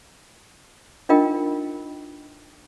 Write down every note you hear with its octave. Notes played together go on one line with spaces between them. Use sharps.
D4 D#4 F4 A#4 D#5 G5